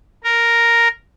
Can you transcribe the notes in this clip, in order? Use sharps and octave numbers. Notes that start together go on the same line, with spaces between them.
A#4